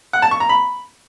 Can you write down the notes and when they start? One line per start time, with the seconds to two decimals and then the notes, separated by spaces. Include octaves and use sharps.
0.13 F#5
0.22 A5
0.31 C#6
0.40 A#5
0.49 B5